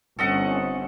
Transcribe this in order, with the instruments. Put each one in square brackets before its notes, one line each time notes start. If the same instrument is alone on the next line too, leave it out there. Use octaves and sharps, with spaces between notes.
[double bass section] G1 C4 C#4 [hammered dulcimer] A4 D#5 F#5